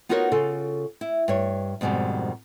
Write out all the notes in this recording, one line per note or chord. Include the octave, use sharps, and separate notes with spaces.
B3 D#4 F4 F#4 A#4 C#5
C#3 F4 A4
E4
G2 C#5
F2 G#2 B2 D#3 G3